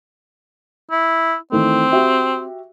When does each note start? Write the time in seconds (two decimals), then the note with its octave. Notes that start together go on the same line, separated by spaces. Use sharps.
0.91 E4
1.52 D#3 E3 A3 C4
1.92 F#4 G4 E5